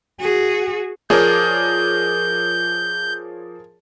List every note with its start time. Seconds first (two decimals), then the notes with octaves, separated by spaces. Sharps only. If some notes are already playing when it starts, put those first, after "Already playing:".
0.20 F#4 G#4
1.10 F3 G#4 A#4 C#5 D5 G6